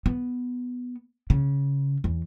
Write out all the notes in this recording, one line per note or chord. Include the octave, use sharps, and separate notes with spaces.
B3
C#3
E2